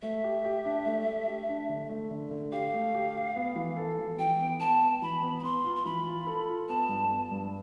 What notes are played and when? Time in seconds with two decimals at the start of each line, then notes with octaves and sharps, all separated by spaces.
0.02 A3 E5
0.24 G4
0.45 G4
0.65 D4
0.86 A3
1.07 A3
1.27 G4
1.49 D4
1.69 D3
1.89 A3
2.11 D3
2.31 D3
2.52 G4 F5
2.73 A3
2.94 G4
3.15 G4
3.36 B3
3.56 E3
3.77 A4
3.99 E3
4.19 E3 G5
4.40 B3
4.60 B3 A5
4.82 B3
5.02 E3 B5
5.22 B3
5.39 B5
5.43 B3 C6
5.64 F4
5.76 C6
5.85 E3 B5
6.06 F4
6.27 A4
6.48 F4
6.68 B3 A5
6.89 G2
7.10 B3
7.31 G2